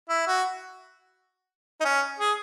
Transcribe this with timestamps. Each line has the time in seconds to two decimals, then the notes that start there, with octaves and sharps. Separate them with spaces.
0.09 E4
0.27 F#4
1.80 D#4
1.85 C#4
2.19 G#4